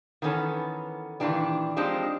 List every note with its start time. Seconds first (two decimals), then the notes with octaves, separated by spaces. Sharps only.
0.22 D#3 E3 B3 C#4 A4
1.20 A#2 D#3 E3 D4 G4
1.77 F3 G#3 C4 D4 D#4 G4